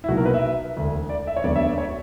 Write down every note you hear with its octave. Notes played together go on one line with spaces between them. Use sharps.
E4
B1 B2 F#3 A#3 F#4
A#4
B4
E5
E1 D2 D3
D5
E5
C#5
E1 D2 D3 F#3 B3 D5
E5
D5
C#5